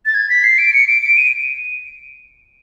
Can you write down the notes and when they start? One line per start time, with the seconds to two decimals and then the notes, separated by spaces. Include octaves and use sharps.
0.06 A6
0.14 G#6
0.30 B6
0.44 C7
0.58 D7
0.73 C#7
0.88 D7
1.02 D7
1.17 D#7